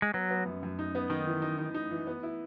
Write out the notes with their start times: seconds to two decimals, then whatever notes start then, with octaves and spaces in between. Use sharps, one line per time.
0.02 G#3
0.14 F#3 B3
0.30 B3
0.45 F#2
0.63 F#2
0.79 D#4
0.95 B3
1.10 D#3 D#4
1.27 E3
1.42 D#4
1.58 D#4
1.74 D#4
1.91 E3
2.07 B3
2.23 E4